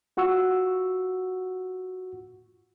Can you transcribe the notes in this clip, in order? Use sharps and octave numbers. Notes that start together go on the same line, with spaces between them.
F4 F#4 F#5 C#6 E6